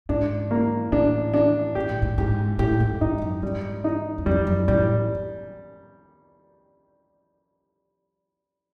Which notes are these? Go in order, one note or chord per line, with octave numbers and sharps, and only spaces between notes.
G#2 D4
A#3
A2 D4
D4
G#2 G4
A2
G#2
G#2 G4
A2 G4
G#2
G#2 D#4
F#2
G#2 G3
D#4
F#2
F2 G3
F#2
A2 G3